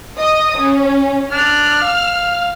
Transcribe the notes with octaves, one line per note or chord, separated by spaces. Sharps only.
D#5 D#6
C#4
D4 F6
F5